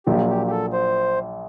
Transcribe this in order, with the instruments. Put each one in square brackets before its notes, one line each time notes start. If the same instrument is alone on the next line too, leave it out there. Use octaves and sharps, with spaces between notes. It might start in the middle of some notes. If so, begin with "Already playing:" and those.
[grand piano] A#1 A#2 F#3 [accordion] G4
[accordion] G4
G4
A4
C5